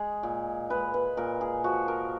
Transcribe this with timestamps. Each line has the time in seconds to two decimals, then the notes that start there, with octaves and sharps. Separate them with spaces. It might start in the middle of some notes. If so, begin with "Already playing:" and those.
Already playing: G#3 G#4
0.23 A#2
0.70 G#3 B4
0.94 B4
1.17 A#2 A#4
1.41 G#4
1.64 F3 F#4
1.88 A#4